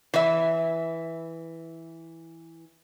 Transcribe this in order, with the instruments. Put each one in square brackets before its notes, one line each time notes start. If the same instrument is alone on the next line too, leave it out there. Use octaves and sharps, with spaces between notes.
[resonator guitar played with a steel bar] E3 E5